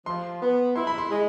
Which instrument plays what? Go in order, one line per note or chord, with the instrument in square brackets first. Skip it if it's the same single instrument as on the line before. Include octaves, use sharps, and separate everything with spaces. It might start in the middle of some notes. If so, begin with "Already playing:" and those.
[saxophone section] F3 [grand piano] C6
[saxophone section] B3
[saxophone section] E4 [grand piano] C6
[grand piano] B5
C6
[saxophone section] G#3